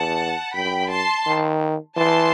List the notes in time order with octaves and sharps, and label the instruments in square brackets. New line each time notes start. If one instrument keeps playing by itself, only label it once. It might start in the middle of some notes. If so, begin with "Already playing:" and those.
Already playing: [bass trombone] E2 [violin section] F#5 A5
[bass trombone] F#2 [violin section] G5 B5
[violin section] A5 C6
[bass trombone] D#3
[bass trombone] E3 [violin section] A5 C6